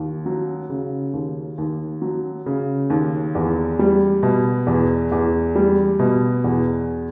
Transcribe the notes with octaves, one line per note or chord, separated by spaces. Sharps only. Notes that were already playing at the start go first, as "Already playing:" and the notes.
Already playing: D#2
F#3
C#3
D#2
D#2
F#3
C#3
D#2
E2
G3
B2
E2
E2
G3
B2
E2